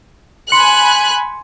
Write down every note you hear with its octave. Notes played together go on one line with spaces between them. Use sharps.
G#5 B5 C6 F#6 C#7